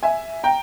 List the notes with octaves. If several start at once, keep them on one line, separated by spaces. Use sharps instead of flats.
E5 G#5
G5 A#5